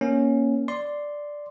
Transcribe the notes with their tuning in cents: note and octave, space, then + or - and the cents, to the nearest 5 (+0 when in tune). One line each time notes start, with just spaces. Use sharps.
A#3 +20 C#4 +0
D5 +0 C6 +0